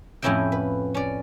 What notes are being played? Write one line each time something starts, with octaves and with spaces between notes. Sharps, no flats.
F2 A2 C#4 E4 D#5 G5
B4
C#4 D5